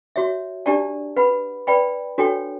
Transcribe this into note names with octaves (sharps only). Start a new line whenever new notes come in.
F#4 C#5 E5
D4 G4 D5 A5
B4 F#5 B5
B4 D5 G5 B5
D4 F#4 A4 C#5 G5